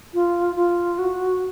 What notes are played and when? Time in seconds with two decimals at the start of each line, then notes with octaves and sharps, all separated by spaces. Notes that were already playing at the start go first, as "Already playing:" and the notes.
0.14 F4
0.56 F4
0.99 F#4